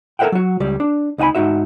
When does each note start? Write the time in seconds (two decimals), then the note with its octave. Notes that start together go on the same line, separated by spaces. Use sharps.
0.19 A4 A#4 C5 E5 F#5 G5
0.32 F#3 F#4
0.60 C#2 G3 D5
0.80 D4
1.18 C#2 D#4 F#5 G#5 B5
1.35 G#2 F#3 D#4 F#4 E5